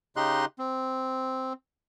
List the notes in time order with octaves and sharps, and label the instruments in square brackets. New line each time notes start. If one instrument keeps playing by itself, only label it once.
[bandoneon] C#3 D#4 G4 D#5 C6 F#6
C4